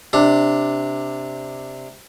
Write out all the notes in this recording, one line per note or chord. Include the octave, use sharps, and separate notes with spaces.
C3 D4